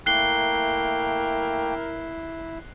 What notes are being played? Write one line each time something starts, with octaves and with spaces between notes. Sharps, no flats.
A3 A#3 E4 A#4 G5 F#6 C7 G7